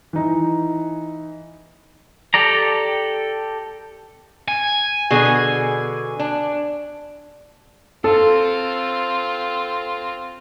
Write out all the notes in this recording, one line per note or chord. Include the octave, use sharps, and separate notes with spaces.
E3 D#4
G4 A4 D5 A#5
G#5
B2 D3 G#4
D4
C4 F4 A4